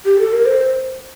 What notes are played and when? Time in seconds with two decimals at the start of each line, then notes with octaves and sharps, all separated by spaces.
0.05 G4
0.19 A4
0.32 A#4
0.46 C5